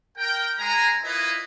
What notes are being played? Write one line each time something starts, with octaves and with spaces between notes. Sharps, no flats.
A#4 G5
G#3 G#5 A#5
E4 F4 A#4 B4 C#5 D#5